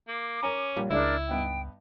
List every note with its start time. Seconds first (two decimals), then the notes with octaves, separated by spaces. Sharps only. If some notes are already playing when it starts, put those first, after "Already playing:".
0.08 A#3 D6
0.43 C#4 A#4 G#5 A#5
0.77 A#1 G3 C#5
0.91 C#2 G#3 D4 E4 A#4 D5 E5 D6
1.29 G2 B3 D#4 G5